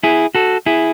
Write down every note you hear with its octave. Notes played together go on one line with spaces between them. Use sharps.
E4 G#4
F#4 A4
E4 G#4